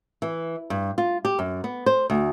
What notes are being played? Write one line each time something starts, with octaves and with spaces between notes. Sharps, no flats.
E3
G2
F4
G4
F#2
B3
C5
D2